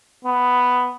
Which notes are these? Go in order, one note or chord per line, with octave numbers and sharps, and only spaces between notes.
B3